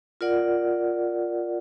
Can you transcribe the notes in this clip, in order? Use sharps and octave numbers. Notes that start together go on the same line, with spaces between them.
F4 A#4 D5 F#5